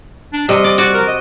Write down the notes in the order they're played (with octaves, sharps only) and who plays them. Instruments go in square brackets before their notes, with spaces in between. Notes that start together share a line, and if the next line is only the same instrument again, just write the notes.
[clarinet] D4
[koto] C3 [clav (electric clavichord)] G3 [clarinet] D#5
[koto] D5
F#4 D5
[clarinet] A#4
D#5